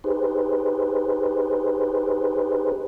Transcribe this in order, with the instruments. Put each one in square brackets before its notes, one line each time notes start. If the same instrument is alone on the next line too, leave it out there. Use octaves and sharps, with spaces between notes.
[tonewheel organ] D#4 G4 G#4 B4 C5